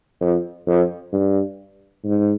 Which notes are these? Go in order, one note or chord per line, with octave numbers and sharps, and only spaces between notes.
F2
F2
G2
G#2